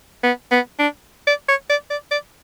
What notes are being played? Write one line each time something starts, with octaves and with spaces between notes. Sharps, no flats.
B3
B3
D4
D5
C#5
D5
D5
D5